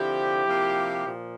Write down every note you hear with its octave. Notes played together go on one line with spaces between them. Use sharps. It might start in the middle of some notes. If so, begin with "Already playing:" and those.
Already playing: D3 F3 C4 E4 G4
C3 F3 A#3
A#2 F3